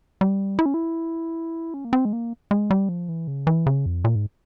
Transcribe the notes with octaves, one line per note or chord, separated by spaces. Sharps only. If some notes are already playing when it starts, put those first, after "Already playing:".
G3
E4
C#4
E4
C#4
A#3
C4
G#3
A#3
G#3
G3
F3
E3
C#3
E3
C#3
F2
A#2
G#2